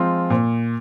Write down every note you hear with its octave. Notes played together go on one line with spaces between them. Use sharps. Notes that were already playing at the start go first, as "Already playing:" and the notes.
Already playing: F3 G#3 C4 F4
A#2